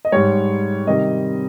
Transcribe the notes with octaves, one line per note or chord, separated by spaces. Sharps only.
D#5
G#2 G3 C#5
C3 D#3 G3 D#5